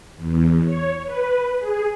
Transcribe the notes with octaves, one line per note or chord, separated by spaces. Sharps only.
E2
C#5
B4
G#4